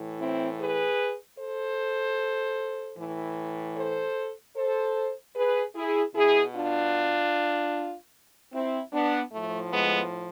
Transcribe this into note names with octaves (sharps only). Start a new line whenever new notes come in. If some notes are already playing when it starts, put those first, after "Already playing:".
Already playing: A2 E3
C4 E4
G#4 B4
A4 C5
A2 E3
A4 C5
A4 C5
G#4 B4
E4 G#4
B2 E4 G#4
D4 F4
C4 E4
B3 D4
A2 F3 A3
G#3 B3